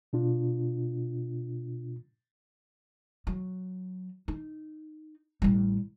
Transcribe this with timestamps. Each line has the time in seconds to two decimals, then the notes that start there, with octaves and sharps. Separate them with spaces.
0.13 B2 D4 F4
3.27 F#3
4.28 D#4
5.42 A1 G3